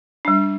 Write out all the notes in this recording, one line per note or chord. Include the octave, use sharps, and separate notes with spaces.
G3 D4